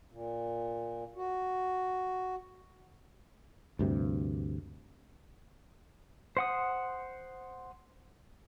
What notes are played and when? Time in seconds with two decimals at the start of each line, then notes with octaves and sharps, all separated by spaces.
0.11 A#2
1.16 F#4
3.79 D2 G2 C3
6.37 C5 F#5 D#6